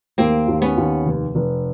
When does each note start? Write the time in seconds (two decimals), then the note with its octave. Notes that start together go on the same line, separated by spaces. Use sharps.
0.18 D#2 A#3 C4
0.48 D#2
0.62 B3 C#4
0.77 D#2
1.06 F1
1.35 F1